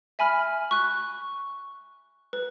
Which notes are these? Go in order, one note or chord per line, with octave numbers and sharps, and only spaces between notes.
E5 G#5 B5 F6
C#6 F#6
B4